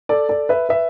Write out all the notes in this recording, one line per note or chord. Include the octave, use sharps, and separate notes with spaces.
A4 D5
A4 D5
B4 E5
B4 E5